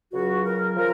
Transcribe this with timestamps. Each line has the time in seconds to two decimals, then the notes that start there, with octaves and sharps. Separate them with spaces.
0.13 C#2 C#3 F#3 F#4
0.46 A#4
0.76 C#3 F3 A#4